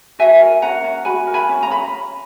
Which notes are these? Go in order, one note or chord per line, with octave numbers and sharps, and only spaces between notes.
F#4 E5 G#5
A#4
C#4 F#5 A#5
C#4
F#4 G#5 B5
A#4
G#5 B5
C#4
A#5
C#4 B5